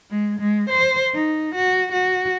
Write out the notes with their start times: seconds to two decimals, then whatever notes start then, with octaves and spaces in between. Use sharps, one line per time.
0.10 G#3
0.40 G#3
0.70 C5
1.14 D#4
1.55 F#4
1.92 F#4